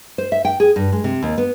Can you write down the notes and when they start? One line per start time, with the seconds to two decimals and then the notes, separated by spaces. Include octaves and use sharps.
0.18 C5
0.32 E5
0.45 G5
0.60 G#4
0.76 G2
0.92 G#3
1.04 C3
1.23 D#2
1.38 B3